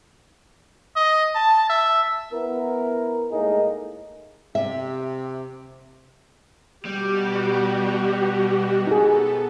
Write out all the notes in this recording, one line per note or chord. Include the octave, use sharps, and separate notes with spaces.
D#5
A5
E5
B3 E4 A#4
A2 G#3 A#3 D#4 G#4 A#4
C3 E5
B2 G3 F#4 G4
B3 D#4 G#4 A4